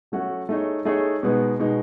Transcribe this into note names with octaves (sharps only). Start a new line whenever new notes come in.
F#3 A3 C#4 F#4 A4
A3 D#4 G#4 C#5
A3 D#4 G#4 C#5
B2 G#3 B3 D#4
B2 G#3 B3 D#4